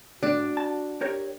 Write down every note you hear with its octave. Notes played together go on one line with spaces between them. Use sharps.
A2 D4 F#4
A5
G4 A#4 C#5